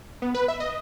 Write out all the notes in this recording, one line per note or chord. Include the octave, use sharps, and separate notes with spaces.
B3
B4
E5
D#5